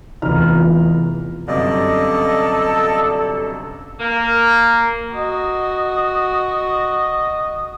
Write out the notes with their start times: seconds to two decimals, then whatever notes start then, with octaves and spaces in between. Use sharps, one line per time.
0.22 F1 E2 F4 A#5 B5 F6
1.48 G1 F#2 C3 A4 D5 D#5
4.00 A#3
5.14 F#4 D#5